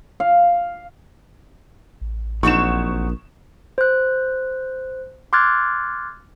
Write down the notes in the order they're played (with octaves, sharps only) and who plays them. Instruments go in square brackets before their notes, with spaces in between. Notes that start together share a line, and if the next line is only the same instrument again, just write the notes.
[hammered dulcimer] F5
[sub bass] A1
[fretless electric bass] A#1 [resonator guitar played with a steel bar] F#3 C4 D#4 [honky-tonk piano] C#6 E7
[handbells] C5 F#6
C6 D6 F6 F#6 G#6 A6